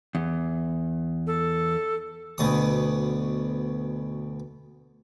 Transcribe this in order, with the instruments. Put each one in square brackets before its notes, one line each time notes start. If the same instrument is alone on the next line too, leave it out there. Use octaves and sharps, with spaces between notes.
[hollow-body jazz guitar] E2
[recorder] A4
[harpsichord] D2 B2 D#6